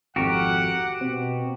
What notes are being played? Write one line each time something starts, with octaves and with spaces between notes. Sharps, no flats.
G#1 F2 F#4 G4 A#4 F#5
B2 C4